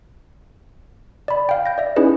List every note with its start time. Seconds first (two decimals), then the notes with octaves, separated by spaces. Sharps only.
1.28 D5 B5
1.49 F5 G5
1.66 G6 A#6
1.78 D5 E5
1.96 C#4 D#4 E4 G#4 B4